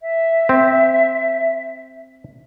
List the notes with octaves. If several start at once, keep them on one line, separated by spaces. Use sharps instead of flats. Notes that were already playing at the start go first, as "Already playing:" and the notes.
E5
C4